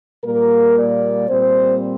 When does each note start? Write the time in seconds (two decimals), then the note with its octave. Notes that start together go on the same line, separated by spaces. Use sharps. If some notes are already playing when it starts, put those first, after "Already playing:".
0.24 A#2 G3 A#3 A#4
0.76 D5
1.28 A#2 G3 C4 C5